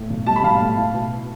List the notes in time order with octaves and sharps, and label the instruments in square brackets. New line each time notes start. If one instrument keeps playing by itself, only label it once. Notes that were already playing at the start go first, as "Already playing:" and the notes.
Already playing: [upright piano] A2
B1
G3 A5
B5
B1 F5 A5
A2
E4
B2